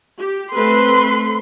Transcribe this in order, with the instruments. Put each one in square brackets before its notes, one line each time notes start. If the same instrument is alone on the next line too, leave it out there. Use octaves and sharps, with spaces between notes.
[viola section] G4
[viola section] A3 C4 B4 [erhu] C6